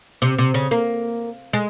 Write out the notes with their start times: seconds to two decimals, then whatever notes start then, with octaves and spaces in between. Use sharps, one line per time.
0.22 C3
0.38 C3
0.54 C#3
0.71 A#3
1.53 G#3